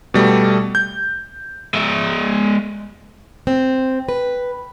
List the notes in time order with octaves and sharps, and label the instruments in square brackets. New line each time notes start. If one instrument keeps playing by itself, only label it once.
[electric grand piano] B2 G3 A3
G6
[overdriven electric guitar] G#3 E5
[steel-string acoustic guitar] C4
B4